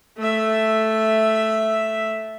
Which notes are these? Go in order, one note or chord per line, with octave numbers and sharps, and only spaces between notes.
A3 E5